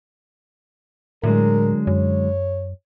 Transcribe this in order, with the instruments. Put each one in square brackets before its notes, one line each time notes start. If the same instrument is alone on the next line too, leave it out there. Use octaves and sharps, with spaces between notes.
[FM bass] A2 [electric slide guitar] D3 F#3 G#3 [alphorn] A#4
[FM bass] F#2 [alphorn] C#5